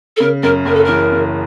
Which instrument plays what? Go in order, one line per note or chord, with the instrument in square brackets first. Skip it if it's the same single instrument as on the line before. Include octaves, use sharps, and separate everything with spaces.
[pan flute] A4
[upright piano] C#3 [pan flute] A#4
[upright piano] F#2 [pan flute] A#4
[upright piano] F#1 [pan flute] A#4
[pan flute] A4
[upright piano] E3 [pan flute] A#4
[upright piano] C#3